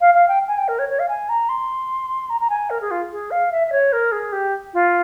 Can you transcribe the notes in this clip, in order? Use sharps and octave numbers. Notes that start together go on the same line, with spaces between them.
F5
F5
G5
G#5
G5
A#4
C#5
C#5
F5
G#5
A#5
C6
A#5
A#5
G#5
A#4
G#4
F4
G#4
F5
E5
E5
C#5
A#4
G#4
G4
F4